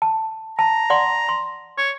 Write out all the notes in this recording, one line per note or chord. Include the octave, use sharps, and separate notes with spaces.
A5
A5 A#5
D5 F#5 C6
C6
C#5